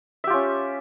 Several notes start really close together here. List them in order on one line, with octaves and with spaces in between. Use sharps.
E5 G4 F4 C#4